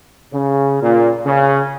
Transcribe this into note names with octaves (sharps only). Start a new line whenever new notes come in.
C#3
A#2
C#3